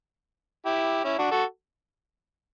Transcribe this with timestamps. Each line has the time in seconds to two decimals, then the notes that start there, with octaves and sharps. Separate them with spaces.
0.65 E4 G4
1.04 C#4 E4
1.18 D4 F#4
1.31 F#4 A4